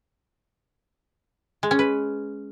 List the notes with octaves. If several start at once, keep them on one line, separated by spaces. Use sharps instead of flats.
G#3
C#4
B4